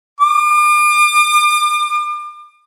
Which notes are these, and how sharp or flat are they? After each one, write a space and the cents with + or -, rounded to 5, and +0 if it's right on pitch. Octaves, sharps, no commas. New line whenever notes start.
D6 +40